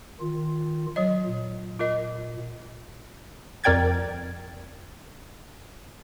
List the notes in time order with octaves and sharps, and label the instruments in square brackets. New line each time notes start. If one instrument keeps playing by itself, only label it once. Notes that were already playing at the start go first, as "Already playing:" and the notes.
[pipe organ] D#3 F4
[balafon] F#3 C#5 D#5
[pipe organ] A#2
[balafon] F4 A#4 D#5
[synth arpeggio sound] F2 A#4 D5 G5 G#6 A6